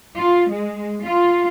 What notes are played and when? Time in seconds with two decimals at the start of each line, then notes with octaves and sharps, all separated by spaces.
0.17 F4
0.50 G#3
1.05 F4